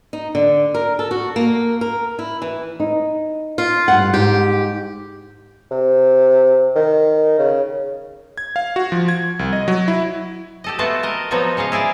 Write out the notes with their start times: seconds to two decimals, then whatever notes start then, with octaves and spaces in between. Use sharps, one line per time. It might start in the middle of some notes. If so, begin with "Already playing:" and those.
0.13 D#4
0.35 D3
0.74 A#4
0.99 A4
1.11 F#4
1.36 A#3
1.81 A#4
2.19 E4
2.42 E3
2.80 D#4
3.58 F4
3.88 G2 F#5
4.14 G#2 G4
5.71 C3
6.75 D#3
7.39 C#3
8.38 G#6
8.56 F5
8.76 F#4
8.92 F3
9.08 G#6
9.39 C2
9.53 D#5
9.68 F#3
9.88 E4
10.64 G4 A4 D#5
10.79 A3 B3 F4 F#4 A5
11.03 A4 A#4 D#5
11.31 F3 F#3 B3 D#4 F#4 C#5
11.57 C#3 C#5 D#5 F5
11.72 E4 G#4 A#4 D5